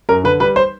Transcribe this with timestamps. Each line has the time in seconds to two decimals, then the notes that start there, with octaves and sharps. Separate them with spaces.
0.09 F#2 A#4
0.24 D3 B4
0.40 G3 B4
0.56 C5